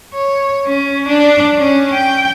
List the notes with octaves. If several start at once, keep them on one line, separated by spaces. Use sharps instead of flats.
C#5
C#4
D4 D5
C#4
G5